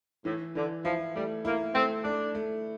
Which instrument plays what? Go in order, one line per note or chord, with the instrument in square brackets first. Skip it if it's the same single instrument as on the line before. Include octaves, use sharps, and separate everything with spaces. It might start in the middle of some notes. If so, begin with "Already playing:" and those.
[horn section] A2 [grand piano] E3
[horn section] D3 [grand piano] E3
[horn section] F3 [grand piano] E4
[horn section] G3 [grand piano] A3
[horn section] A#3 [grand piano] E4
[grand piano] A3 [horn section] C4
[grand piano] A3 [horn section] D4
[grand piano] A3